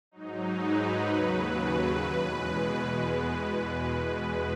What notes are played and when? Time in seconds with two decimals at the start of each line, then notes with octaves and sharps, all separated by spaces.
0.11 G#2 F#3 D#4
0.60 B4
1.09 D#2 C#3 F#3
1.57 B4
2.05 E2 B2 G#3